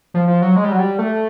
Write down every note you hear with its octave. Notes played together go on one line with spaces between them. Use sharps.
F3
F3
F#3
G#3
G3
F#3
G3
A3